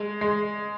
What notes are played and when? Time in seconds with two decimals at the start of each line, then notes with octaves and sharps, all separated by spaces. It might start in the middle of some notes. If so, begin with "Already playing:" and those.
Already playing: G#3
0.21 G#3